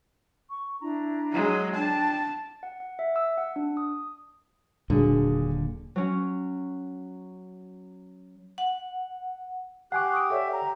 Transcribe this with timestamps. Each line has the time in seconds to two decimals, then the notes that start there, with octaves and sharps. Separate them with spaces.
0.50 C#6
0.81 D4 E4 A#5
1.32 F#3 G#3
1.74 D4 G5 A5
2.63 F#5
2.80 F#5
2.99 E5
3.16 E6
3.38 F#5
3.56 D4
3.77 D#6
4.90 D#1 A#2 D3 F#3 D4 G#4
5.96 F#3 C#4
8.58 F#5
9.92 G4 F#5 G#5 C#6 D6 F#6 C7
10.12 C#6 D#6 D7
10.30 A4 C#5 D5 E5
10.53 A#5